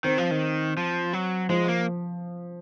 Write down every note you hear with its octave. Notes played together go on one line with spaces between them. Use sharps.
D#3 C4
F3
D#3
F3
F#3
F3 G#3
A#3